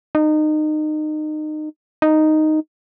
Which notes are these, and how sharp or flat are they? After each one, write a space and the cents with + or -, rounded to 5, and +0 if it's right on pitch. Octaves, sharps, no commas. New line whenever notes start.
D#4 -25
D#4 -5